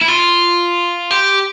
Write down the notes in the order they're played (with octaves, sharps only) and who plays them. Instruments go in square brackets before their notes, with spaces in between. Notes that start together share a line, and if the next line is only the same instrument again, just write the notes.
[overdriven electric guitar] E4
F4
G4